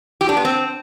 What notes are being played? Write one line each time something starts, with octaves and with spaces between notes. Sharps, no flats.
G4
D4
B3
C4